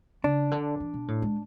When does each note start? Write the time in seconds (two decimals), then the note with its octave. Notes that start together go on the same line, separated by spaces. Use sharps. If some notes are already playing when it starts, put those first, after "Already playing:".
0.24 C#3 D4
0.51 D3
0.80 E3
0.94 B2
1.08 A2
1.22 G#3